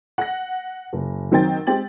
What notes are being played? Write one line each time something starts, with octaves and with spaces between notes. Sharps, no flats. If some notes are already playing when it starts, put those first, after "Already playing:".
F#5 A#6
F#1
D#3 F#3 C4 D#4 G5 A6
G#3 C4 G4 A6 F#7